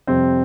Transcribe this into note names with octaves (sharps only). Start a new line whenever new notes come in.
F2 C3 G3 C4